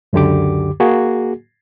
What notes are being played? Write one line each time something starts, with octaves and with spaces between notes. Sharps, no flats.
C#2 F#2 D3 G4 D6
A#3 F#4 G#4